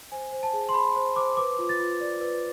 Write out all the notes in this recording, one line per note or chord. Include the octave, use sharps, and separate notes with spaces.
C5 G#5
C5
A5
G#4
C6
G#4 B5
C5
C5 D6
B4 D6
F4
A6
F4
D5
B4